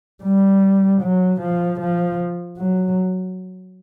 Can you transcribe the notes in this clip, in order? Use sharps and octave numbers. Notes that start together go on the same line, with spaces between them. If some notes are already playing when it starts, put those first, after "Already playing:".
G3
F#3
F3
F3
F#3